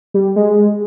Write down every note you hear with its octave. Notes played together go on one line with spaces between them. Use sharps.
G3
G#3